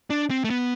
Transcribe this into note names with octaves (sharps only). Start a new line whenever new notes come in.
D4
C4
A3
B3